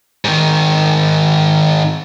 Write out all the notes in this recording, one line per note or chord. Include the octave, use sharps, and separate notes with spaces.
G#2 D#3